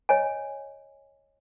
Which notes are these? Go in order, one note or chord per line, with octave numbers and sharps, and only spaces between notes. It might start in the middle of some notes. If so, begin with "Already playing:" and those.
C#5 D#5 G#5